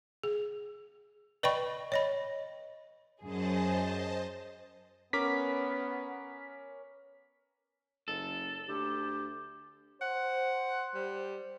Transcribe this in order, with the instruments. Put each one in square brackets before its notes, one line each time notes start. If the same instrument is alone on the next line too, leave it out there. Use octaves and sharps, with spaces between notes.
[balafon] G#4
B4 D5 D#5 G5 B5 C#6
C#5 D#5 B5
[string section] F#2 G#4 [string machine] C5 D#5 A5
[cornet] B3 [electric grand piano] C#4 A#4 D6 [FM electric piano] B6
[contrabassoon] F#1 [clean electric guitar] A4
[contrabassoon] D2 [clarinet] G4
[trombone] C5 [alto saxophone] F#5
[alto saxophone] G3